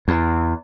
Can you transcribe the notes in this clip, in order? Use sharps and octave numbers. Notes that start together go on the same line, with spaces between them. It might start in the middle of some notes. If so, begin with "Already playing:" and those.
E2